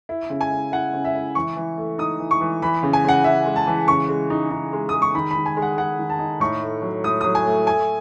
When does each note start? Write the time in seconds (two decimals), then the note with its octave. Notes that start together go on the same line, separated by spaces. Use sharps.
0.09 E4
0.30 C#3
0.41 G#5
0.51 E4
0.72 E4 F#5
0.93 C#3
1.05 E5
1.15 E4
1.35 E3 C#6
1.56 E3
1.78 A3
1.98 D#4 D#6
2.20 E3
2.31 C#6
2.41 E3
2.62 E3 B5
2.83 C#3
2.93 G#5
3.04 C#3 F#5
3.24 C#3 E5
3.46 G#3
3.56 A5
3.67 E3
3.88 C#3 C#6
4.09 G#3
4.30 D#4
4.51 D#4
4.73 G#3
4.89 G#3 D#6
5.02 C#6
5.15 D#3 B5
5.31 B5
5.36 D#3
5.46 G#5
5.57 G#3
5.62 F#5
5.78 G#3 F#5
5.99 D#3
6.10 A5
6.19 D#4
6.40 A2 C#6
6.62 A3
6.82 F#3
7.04 A2 D#6
7.21 F#3 D#6
7.35 G#5
7.46 A3
7.66 A3 G#5